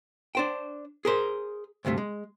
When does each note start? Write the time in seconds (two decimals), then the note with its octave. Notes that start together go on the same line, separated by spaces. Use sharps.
0.35 D4 C5 G5
1.05 G#4 A#4 C5
1.85 D2 G2 C3 A3
1.98 G#3